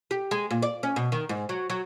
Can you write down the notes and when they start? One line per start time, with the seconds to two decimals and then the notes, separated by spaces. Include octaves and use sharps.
0.11 G4
0.31 G#3
0.51 A#2
0.62 D5
0.83 C#4
0.96 B2
1.12 D#3
1.29 G#2
1.49 F#3
1.70 F#3